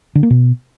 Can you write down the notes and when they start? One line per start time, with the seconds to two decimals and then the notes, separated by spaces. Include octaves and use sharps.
0.15 D3
0.23 A#3
0.30 B2